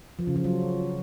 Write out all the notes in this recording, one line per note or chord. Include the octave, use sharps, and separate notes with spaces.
F3
C#3
F3
F#3